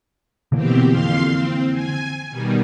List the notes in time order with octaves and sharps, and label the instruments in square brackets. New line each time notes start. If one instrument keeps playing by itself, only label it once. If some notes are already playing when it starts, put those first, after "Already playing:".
[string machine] B2 C4 G4 [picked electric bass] D3 E3 A#3
[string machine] F2 F5 C6
C4
G#5
B2 D#3 G3